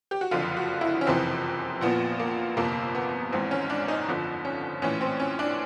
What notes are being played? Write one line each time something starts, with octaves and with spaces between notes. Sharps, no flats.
G4
F#4
F#1 F2 D3 F3 F4
F#4
E4
C#4
F#1 F2 C3 E3 C4
A#1 A#2 F3 B3
A#3
G1 F2 C3 A#3
B3
G#1 G#2 E3 C4
C#4
D4
D#4
G1 F2 D3 F3
C#4
A#1 A2 E3 C#4
C4
C#4
D4